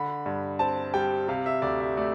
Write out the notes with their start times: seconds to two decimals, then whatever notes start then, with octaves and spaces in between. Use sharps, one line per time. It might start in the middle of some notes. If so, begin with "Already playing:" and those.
Already playing: D3 B5
0.26 G2
0.59 C4 A5
0.94 G3 G5
1.28 C3 F5
1.46 E5
1.62 D2 D5
1.80 E5
1.97 A3 D5